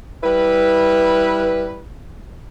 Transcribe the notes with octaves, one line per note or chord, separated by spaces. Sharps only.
G3 E4 B4